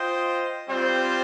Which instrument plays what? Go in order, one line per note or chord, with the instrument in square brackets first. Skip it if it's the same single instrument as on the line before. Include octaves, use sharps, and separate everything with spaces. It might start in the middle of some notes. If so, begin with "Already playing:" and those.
Already playing: [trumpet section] F4 C5 D#5 G5
G3 C4 F4 C5